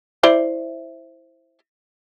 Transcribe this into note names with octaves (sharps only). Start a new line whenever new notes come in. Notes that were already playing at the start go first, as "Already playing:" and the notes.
E4 C5 D5